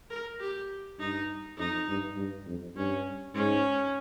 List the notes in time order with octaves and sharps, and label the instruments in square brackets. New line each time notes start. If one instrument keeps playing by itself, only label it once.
[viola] A#4
G4
[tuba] G2 [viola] D#4
[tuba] F2 [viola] D#4
[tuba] G2
G2
F2
[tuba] G2 [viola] C#4
[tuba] G#2 [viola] C#4